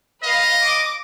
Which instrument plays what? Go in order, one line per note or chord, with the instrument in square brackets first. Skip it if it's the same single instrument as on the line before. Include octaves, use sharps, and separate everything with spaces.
[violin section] B4 F5 [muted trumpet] D#5
[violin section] D6